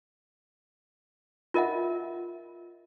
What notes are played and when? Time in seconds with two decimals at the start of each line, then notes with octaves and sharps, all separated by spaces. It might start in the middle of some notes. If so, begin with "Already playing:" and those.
1.54 F4 A#4 D#5 E5 F#5